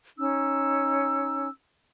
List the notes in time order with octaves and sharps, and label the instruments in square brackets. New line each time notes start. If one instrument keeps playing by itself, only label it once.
[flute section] C#4 D#4 E6